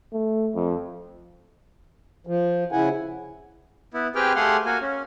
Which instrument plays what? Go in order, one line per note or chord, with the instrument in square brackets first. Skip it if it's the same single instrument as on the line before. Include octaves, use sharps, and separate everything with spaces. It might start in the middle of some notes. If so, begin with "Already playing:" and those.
[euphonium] A3
F2
[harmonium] F3
C#3 E4 F#5 G#5
[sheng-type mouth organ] B3 E4
C4 G4 G#4 B4 G5 F6
A3 G4 G#4 F5 F#5 C6
A#3 F#4 G#5
C#4